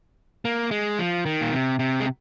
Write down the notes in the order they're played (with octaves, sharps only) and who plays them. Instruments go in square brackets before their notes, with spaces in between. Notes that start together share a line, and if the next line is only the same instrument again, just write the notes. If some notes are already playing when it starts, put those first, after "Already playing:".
[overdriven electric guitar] A#3
G#3
F3
D#3
A#2
C3
C3
G#3